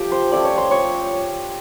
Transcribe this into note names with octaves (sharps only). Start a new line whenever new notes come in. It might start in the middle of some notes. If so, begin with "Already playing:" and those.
Already playing: F3 A3 G4
C5
F3 A3 C#4 D5
C#5
C5
C#5